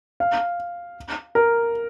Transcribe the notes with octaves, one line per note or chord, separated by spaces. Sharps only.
F5
A#4